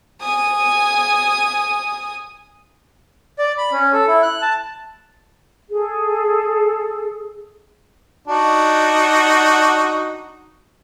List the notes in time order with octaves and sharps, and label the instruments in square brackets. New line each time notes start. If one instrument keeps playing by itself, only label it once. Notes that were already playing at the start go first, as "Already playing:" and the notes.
[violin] G#5 D#6
[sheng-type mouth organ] D5
B5
C#4
A4
E4
F#6
A5
[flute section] G#4 A4
[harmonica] D4 D#4 F#4